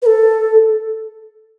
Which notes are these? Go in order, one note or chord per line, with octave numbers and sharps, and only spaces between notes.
B4
A4